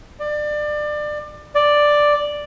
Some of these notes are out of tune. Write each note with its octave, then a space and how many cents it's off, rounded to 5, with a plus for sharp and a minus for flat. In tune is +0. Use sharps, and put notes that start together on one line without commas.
D5 +25
D5 +5